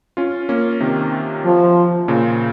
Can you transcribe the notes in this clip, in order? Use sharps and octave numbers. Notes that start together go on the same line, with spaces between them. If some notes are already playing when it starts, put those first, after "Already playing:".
C#4 F4
A#3 C#4
C3 D#3
F3
A#2 C#3